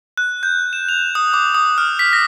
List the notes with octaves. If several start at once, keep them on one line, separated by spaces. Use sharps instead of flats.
F#6
G6
E7
F7
D#6
D6
D#6
F6
B6
A#6